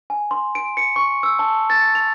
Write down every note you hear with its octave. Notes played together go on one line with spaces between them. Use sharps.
G#5
C6
D7
C#7
C#6
E6
A5
A6
F7